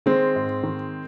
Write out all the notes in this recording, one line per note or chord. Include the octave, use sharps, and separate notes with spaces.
D#3 G#3 C4
G#2
D#3